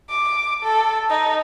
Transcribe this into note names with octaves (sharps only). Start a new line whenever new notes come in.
D6
A4
D#4